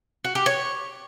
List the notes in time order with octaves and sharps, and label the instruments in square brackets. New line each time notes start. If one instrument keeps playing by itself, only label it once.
[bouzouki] F#4
G4
C#5